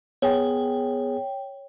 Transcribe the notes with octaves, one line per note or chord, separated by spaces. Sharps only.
B3 G#4 C#5 G5